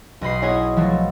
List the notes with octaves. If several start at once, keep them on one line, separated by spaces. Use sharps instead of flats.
B1 D#5 B5 C7
B3 E4 G#4 C#5 D#5 G#5
F3 F#3 A3